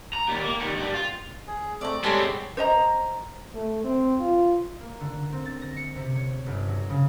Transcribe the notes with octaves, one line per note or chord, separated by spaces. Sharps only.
A#5
D#2 G3
A#3
D#3 G3
G2 G3
F4
G#4
A3 C4 D5 A#5
G3 G#3 B3 C4 A4 C#5 D6
C5 D#5 A#5
A3
C4
F4
A#3
D3
C4
A6
A#6
C#7
C3
C#5
G1
F#3
C#3